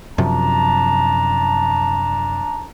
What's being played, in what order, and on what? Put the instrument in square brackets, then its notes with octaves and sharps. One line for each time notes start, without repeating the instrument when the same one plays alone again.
[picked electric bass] F#2 C3 F3 [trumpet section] D4 A5 A#5